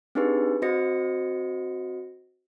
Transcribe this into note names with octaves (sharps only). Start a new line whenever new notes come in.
C4 D4 D#4 G4 G#4 B4
C4 F#4 C5 D#5 A#6 C#7